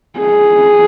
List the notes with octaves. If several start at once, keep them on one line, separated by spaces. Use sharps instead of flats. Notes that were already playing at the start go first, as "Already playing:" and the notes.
G#4